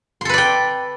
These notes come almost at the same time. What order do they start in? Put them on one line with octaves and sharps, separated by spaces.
C6 A4 B4 D5 G5